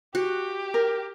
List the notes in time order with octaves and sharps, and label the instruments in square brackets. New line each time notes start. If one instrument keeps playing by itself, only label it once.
[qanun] F#4 [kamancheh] G4
[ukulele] A#4